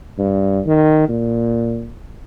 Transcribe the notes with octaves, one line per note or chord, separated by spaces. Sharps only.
G2
D#3
A#2